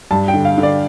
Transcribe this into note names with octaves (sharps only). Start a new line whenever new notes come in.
G2 A5
G5
D3
F5
D3
D5